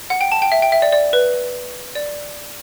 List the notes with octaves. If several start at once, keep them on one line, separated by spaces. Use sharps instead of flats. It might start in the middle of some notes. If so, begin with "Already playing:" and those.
F#5
G5
A5
G5
E5
G5
E5
D5
D5
B4
D5